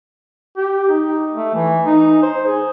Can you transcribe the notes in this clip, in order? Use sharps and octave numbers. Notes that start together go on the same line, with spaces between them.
G4
D#4
A3
E3
D#4
C5
G#4